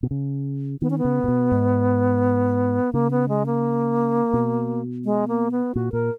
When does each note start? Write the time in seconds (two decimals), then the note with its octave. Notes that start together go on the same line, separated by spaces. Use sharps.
0.03 B2
0.11 C#3
0.82 D#3 B3
0.90 C#4
0.98 B3
1.05 C#3
1.24 A#2
1.28 B2
1.52 G#2
2.93 C#3 A#3
3.11 B3
3.29 G#3
3.46 A#3
4.33 B2
5.05 G#3
5.28 A#3
5.51 B3
5.75 A#2 F#4
5.92 A#2 A#4